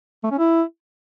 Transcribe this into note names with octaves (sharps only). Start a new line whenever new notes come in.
A3
C#4
E4